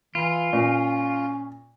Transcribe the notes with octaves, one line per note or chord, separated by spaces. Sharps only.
E3 F4
A#2 C#4